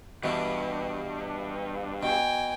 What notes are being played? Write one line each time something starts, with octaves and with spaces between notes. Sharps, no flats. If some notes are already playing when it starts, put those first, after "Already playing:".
G2 B2 E3
B2 G5 G#5